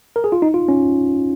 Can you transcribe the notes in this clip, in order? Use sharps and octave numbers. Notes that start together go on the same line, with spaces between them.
A#4
G#4
F4
D#4
F4
C#4